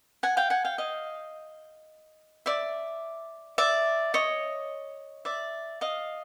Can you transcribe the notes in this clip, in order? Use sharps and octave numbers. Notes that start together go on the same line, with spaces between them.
F#5 G#5
F5 G5
F#5 G#5
F5 G5
D#5 F5
D5 E5
D5 E5
C#5 D#5
D5 E5
D#5 F5